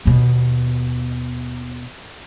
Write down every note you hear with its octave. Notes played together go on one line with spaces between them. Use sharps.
D#2 B2